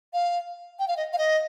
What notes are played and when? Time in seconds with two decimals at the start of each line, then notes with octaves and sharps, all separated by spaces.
0.13 F5
0.79 G5
0.88 F5
0.97 D#5
1.13 F5
1.18 D#5